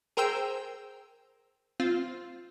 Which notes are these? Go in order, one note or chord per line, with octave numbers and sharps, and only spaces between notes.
G#4 A#4 C5 G5 E6
C4 F4